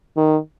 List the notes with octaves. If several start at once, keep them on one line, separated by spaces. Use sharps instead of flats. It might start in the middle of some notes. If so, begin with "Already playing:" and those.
D#3